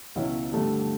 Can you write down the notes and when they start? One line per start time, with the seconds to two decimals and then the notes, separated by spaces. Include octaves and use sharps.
0.15 C#2 B2 F#3 C#4 E4
0.52 G2 D3 A3